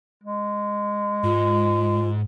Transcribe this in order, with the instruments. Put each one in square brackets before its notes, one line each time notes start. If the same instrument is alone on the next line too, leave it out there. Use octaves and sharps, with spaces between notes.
[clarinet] G#3
[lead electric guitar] G#2 [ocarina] F4